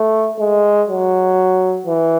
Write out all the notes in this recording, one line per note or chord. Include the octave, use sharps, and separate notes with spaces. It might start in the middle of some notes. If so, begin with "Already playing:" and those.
Already playing: A3
G#3
F#3
E3